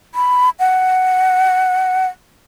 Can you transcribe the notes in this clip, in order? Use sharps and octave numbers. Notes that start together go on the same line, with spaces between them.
B5
F#5